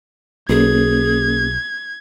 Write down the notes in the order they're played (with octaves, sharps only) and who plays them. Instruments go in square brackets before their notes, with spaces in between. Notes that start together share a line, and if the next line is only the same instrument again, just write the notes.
[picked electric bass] B1 [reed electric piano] A#3 C#4 [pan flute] G#4 [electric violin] G#6